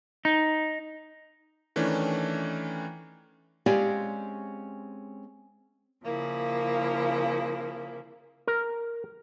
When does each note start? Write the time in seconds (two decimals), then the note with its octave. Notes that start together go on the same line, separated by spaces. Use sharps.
0.25 D#4
1.76 D#3 E3 A3 C#4 D4
3.66 G#3 C4 C#4 G4 D5 F5
6.04 C#3 F3 A#3 E4
8.47 A#4